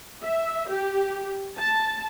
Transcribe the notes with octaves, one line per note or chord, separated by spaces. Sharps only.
E5
G4
A5